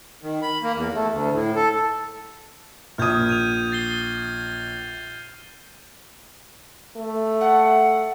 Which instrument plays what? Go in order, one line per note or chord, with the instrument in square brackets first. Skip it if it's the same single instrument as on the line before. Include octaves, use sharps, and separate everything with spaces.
[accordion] D#3
B5
A#3
E2
A3
D2
A2
A4
[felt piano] A#1 D#6 [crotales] F6 G6 G#6
[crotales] G6 D#7 F7
A6 C7 G7
[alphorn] A3
[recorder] F#5